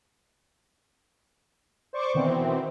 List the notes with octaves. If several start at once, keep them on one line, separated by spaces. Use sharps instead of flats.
C5 D5 C#6 D6
B2 D#3 E3 B3 C4